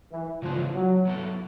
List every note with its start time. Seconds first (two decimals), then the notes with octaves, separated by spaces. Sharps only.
0.11 E3
0.42 C#3 E3 F3 G#3 B3 D4
0.74 F#3
1.05 F#3 B3 E4 A4